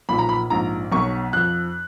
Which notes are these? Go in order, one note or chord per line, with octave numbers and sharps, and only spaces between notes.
B1 A#2 F3 B5
A#5
B5
A#1 G#2 F3 A#5
B1 B2 F#3 C#6
F2 F3 F#6